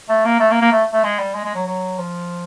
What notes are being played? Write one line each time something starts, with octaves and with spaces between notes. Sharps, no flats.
A3
A#3
A3
A#3
A#3
A3
A3
G#3
G3
G#3
G#3
F#3
F#3
F3